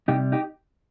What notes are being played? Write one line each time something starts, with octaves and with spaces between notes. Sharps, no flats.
C3 G3 D#4 G4
D#4 G4